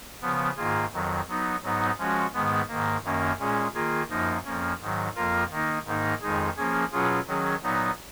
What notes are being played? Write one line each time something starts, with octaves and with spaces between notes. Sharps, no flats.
C#3 F3 B3
G#2 D#3 A#3 F4 G#4
F2 D#3 F#3
F#3 B3 D#4
G#2 F#3 B3 D#4
F3 G#3 C#4 F#4
G#2 D#3 G#3 B3
G#2 D#3 A#3
F#2 D#3 A#3 C#4
A#2 G#3 C#4 G#4
D#3 A#3 F4 G#4
F#2 F3 A#3 D#4
F2 F3 A#3 C#4
G#2 D#3 F#3
F2 F3 A#3 F4 A#4
D#3 A#3 D#4
G#2 D#3 A#3 D#4
F2 D#3 G#3 D#4 G#4
F3 A#3 C#4 G#4
B2 F#3 C#4 F4 G#4
D#3 F#3 C#4 G#4
A#2 F#3 B3 D#4